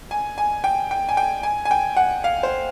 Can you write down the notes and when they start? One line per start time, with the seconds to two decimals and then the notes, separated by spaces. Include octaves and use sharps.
0.11 G#5
0.38 G#5
0.64 G5
0.91 G5
1.09 G#5
1.17 G5
1.43 G#5
1.65 G#5
1.71 G5
1.97 F#5
2.24 F5
2.43 C5